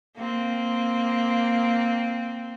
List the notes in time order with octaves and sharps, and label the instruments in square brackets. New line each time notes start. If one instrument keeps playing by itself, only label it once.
[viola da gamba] A#3 C4